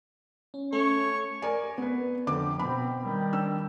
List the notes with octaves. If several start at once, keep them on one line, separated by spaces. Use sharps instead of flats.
C#4
A3 C#4 A4 C#5
A#4 D5 G#5
B3 B4
F2 D3 D6
B2 C4 B5
D#3 G3
D4 E6